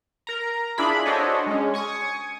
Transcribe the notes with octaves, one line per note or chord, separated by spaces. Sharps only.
A#4 A#5
D4 E4 F4 G#4 B5
D4 F#4 A4 C5 C#5 D#5
G#3 C#4
G#5 C#6 D#6